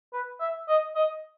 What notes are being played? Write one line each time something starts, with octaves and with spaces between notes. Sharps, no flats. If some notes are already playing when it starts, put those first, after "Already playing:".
B4
E5
D#5
D#5